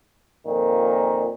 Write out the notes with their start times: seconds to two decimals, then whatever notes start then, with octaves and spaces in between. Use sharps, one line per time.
0.45 F2 A#2 D#3